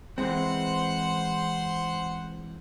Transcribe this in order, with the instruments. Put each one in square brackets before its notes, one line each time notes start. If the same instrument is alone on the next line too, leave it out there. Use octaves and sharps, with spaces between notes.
[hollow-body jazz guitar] E3 G#3 C4 [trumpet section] C5 F#5 C6